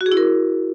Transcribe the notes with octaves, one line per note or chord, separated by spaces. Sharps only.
F#4
G#4
E4
A#4